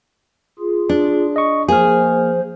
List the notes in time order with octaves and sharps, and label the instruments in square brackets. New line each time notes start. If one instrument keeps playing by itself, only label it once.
[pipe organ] F4 G#4
[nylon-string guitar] D4
[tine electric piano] D#5 C#6
[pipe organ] F3 C5 [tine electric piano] A#3 F6 [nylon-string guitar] G#4